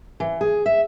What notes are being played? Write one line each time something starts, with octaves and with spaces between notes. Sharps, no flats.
E3
G#4
E5